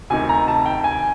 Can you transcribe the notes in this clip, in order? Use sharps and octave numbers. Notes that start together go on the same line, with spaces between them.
D2 C3 D#3 G#5
A#5
A5
G5
G#5